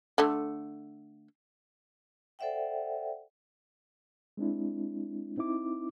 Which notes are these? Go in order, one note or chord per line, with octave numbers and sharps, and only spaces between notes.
D3 A3
A4 C5 D5 E5 F#5 G5
G#3 C4 D4 E4
C4 D#4 E4 D6